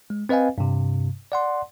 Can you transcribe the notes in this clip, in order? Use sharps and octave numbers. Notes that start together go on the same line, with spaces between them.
G#3
C4 B4 D#5 F5 G#5
G2 C3
D5 F#5 C6